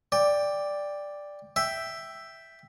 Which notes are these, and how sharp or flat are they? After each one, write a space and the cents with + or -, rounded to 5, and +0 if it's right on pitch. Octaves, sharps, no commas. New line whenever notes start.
D5 +0 G5 +15
E5 +0 G5 +0